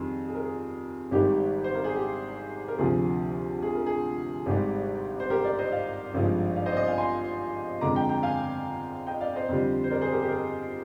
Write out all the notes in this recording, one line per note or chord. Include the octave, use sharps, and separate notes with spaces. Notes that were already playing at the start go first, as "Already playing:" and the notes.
Already playing: F2 D#3 G3 G#4
G#4
A#4
G#4
G#1 G#2 D#3 G3 G4
C5
A#4
G#4
G4
A#4
D2 C3 F3 G#4
G#4
A#4
G#4
G#1 G#2 G3 G4
C5
G4 A#4
A#4 D5
C5 D#5
D5 F5
G#1 G2 F3 G#3
D5 F5
C5 D#5
D5
C5 D#5
F5 G#5
G#5 C6
F2 D3 G#3 A#5 D6
G5 A#5
G5 A#5
F5 G#5
D#5 G5
D5 F5
C5 D#5
F2 D3 G3
C5
A#4 D5
G#4 C5
G4 A#4
G4
A#4
G#4